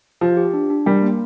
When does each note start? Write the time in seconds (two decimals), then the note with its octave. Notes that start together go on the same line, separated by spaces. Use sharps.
0.21 F3 G4
0.37 G4
0.54 D4
0.70 D4
0.86 G3 A#4
1.02 A#3